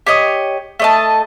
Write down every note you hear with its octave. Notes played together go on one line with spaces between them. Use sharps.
G4 C#5 D#5
A3 D#5 A5